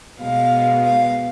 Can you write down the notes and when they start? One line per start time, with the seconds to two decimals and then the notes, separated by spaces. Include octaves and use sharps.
0.21 B2 G#3 B3 F5
0.84 F5